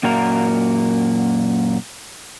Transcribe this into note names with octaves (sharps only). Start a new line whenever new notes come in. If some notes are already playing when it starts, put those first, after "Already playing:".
F#2 A#2 A#3 F#4 A#4 A#5